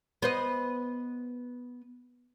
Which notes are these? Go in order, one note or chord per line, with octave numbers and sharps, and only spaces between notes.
B3 C5 D#5